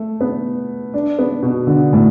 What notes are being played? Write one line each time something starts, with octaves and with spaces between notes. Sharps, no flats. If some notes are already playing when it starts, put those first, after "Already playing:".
Already playing: A3
B3
D4
B3
B2
D3
A2